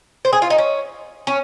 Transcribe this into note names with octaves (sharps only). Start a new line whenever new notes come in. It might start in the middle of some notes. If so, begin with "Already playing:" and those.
C5
G#4
F4
D#4
C#4
C#4